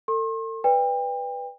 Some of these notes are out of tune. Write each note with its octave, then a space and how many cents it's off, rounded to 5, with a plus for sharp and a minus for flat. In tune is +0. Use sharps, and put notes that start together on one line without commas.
A4 +40 C6 +40
B4 +0 D5 +0 G5 +35